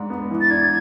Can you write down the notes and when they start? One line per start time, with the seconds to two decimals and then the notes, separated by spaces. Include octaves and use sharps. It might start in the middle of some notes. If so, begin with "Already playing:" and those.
Already playing: G#2 D4
0.10 B3
0.31 E3
0.41 A6
0.50 D4 G#6